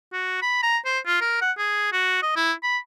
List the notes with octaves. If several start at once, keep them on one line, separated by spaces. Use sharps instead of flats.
F#4
B5
A#5
C5
F4
A#4
F#5
G#4
F#4
D#5
E4
B5